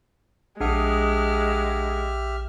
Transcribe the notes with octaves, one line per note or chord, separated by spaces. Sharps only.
A#1 G#3 D4 G4 E5 F#5 D#6 F6